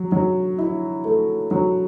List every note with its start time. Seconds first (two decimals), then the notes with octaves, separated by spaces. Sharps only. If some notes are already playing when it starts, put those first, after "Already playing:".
Already playing: F#3
0.12 F#3
0.58 E4
1.05 A3
1.51 F#3